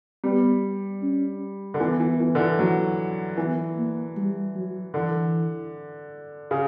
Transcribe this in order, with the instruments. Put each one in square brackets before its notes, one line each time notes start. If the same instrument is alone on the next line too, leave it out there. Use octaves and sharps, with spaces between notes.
[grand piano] G3 [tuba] B3
[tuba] C#4
[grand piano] D3
[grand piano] E3 [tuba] B3
[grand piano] E3
E3
D3
E3
F#3
[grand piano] E3 [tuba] B3
[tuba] A#3
G3
F#3
[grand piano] D3 [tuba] E3
[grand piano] C#3